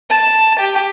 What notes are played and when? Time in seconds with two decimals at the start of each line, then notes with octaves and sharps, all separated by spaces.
0.10 A5
0.60 G4